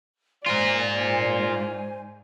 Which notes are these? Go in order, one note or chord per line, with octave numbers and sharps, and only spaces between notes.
G#2 F4 A#4 C5 D5 G#5